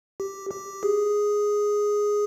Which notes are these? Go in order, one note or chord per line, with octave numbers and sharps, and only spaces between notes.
G4
G4
G#4